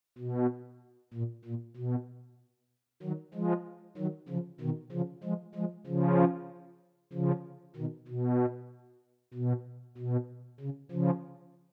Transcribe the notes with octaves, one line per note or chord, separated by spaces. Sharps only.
B2
A#2
A#2
B2
D#3 F#3
F3 G#3
D#3 F#3
C#3 F3
B2 D#3
C#3 F3
F3 G#3
F3 G#3
C#3 F3
C#3 F3
B2 D#3
B2
B2
B2
C#3
C#3 F3